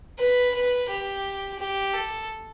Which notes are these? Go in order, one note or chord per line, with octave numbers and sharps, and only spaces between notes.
B4
B4
G4
G4
A4